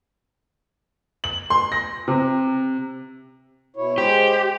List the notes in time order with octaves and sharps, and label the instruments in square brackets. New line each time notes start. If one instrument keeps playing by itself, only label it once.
[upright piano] F#7
C6
A#6
C3
[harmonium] B2 E4 C#5
[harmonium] G#3 C5 [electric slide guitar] G4